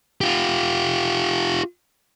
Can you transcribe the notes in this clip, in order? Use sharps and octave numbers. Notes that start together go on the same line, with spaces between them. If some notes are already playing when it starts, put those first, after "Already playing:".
F4 G4